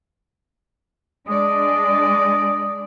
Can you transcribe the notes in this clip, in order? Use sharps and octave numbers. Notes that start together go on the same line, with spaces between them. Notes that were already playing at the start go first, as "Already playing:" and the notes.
G#3 D4 D5 D#5